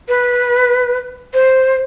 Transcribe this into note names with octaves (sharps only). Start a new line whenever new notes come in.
B4
C5